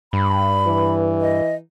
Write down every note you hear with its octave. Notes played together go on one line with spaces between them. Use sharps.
G2 B5
E3
D#5